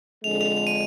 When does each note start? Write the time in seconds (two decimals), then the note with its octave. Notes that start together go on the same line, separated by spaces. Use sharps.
0.24 F2 D3 G#3 F7
0.41 F7
0.56 F7
0.67 D#7